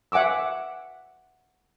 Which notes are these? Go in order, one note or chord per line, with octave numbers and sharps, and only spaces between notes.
E5 F#5 G#5 D6 E6